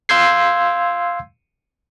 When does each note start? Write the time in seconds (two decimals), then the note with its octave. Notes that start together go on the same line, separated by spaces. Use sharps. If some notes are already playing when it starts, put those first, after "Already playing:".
0.09 F5 C6 E6 G6 G#6 C7